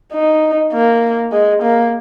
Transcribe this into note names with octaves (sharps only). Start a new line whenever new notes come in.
D#4
A#3
G#3
A#3